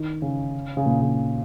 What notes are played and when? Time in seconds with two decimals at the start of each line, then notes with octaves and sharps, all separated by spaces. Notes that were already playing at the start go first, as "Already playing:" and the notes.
Already playing: D#3
0.22 C#3
0.77 C#3
0.86 A#2
1.02 C#3